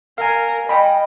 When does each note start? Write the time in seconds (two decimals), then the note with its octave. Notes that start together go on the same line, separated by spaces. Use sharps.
0.18 A#4 F5 G#5
0.69 D#5 G5 B5